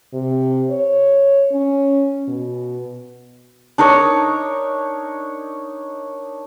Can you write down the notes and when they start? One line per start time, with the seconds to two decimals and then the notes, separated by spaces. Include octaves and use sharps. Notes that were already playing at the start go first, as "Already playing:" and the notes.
0.13 C3
0.70 C#5
1.52 C#4
2.28 B2
3.78 D4 D#4 A#4 C#5